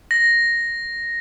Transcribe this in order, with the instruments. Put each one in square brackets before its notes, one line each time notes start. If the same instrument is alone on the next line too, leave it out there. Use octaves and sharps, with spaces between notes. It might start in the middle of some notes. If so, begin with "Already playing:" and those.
[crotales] A#6